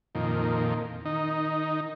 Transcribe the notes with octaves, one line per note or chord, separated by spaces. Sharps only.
F2 A#2 D#3
D#3 D#4